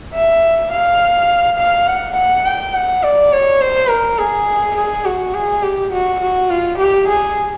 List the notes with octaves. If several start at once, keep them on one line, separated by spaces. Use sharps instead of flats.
E5
F5
F5
F#5
F#5
G5
F#5
D5
C#5
C5
A#4
G#4
G#4
F#4
G#4
G4
F#4
F#4
F4
G4
G#4